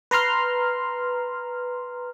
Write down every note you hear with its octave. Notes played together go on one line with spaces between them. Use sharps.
B4 A#5 C6 F6